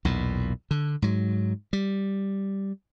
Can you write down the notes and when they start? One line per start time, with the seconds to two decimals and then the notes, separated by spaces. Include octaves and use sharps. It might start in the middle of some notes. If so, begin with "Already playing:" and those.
0.05 B1 E2 A#2
0.71 D3
1.02 G#2 F#3
1.73 G3